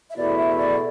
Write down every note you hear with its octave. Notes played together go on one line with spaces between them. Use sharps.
E5
E2 B2 A3 E4 D5
E5
D5